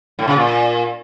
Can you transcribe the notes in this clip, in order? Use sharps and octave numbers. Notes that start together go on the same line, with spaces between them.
A2
C#3
A#2